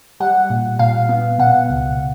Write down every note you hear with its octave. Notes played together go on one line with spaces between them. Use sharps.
G3 F#5
A#2
A#2 F5
B3
B2 F#5
C#2